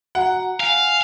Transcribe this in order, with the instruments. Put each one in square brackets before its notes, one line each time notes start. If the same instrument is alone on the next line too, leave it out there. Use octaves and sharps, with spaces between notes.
[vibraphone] F#4 A#5 [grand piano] F#5
[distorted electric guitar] F5 [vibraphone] G#5